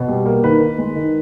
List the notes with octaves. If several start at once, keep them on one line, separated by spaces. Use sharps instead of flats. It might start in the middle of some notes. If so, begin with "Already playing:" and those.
Already playing: B2
G3
A#3
D#3 B4
D#3
G#3
D#3